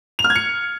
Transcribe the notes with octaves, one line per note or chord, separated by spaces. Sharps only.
F7
F6
G#6
C#7